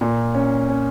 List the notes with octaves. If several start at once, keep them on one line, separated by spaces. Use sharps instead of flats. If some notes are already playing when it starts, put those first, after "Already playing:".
A#2
C#4
C#4